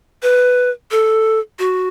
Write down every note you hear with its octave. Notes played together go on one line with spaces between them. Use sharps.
B4
A4
F#4